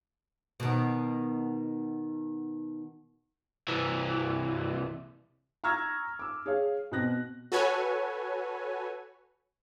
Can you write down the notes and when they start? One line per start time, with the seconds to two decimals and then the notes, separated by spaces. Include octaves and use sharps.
0.60 B2 D#3
3.68 C2 E3
5.64 A#5 C#6 E6 F6 G#6 A#6
6.19 D6 E6
6.46 G#4 C#5 F5
6.92 B2 C4 F#6 A#6
7.52 F#4 A4 B4 C#5 G#5